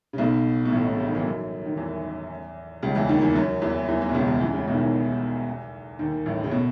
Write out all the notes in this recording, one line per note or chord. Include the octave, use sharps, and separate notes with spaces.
C#3
B1 B2
B2
A1 A2
B2
C#3
D#3
E3
F#2 F#3
D#3
E2 E3
C#2 C#3
E2 E3
D#2 D#3
E2 E3
F#2 F#3
E2 E3
E2 E3
E2 E3
B2
C#2 C#3
E2 E3
E2 E3
C#2 C#3
B1 B2
D#3
E2 E3
D#2 D#3
A1 A2
C#3
B2